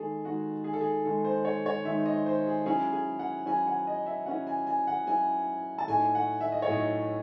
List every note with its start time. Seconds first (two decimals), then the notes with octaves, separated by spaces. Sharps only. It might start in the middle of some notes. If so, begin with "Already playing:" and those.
Already playing: D#3 G#3 D#4 G#4 A4
0.25 D#3 G#3 D#4 F#4
0.64 G#4
0.73 A4
0.81 G#4
1.05 D#3 G#3 D#4 A4
1.25 C5
1.45 C#5
1.66 C#5
1.85 D#3 G#3 D#4 E5
2.06 D#5
2.26 C5
2.46 G#4
2.66 F#3 C#4 E4 G#4
2.93 G#4
3.19 F#5
3.46 F#3 C#4 E4 G#5
3.67 F#5
3.87 D#5
4.06 E5
4.26 F#3 C#4 E4 F#5
4.47 G#5
4.67 G#5
4.87 F#5
5.07 F#3 C#4 E4 G#5
5.78 A5
5.87 A2 F#3 A3 D#4 G#5
6.15 F#5
6.41 E5
6.52 D#5
6.62 C#5
6.67 A2 F#3 A3 D#4 D#5